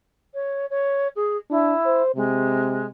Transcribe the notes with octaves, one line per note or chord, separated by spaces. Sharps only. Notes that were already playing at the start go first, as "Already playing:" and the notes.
C#5
C#5
G#4
D4 E4
C5
C3 G#3